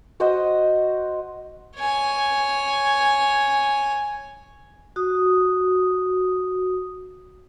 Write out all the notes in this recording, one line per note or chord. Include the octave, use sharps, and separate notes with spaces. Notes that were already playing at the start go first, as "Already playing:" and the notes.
F#4 C5 D#5 D#6
C#5 G#5
F#4 D#6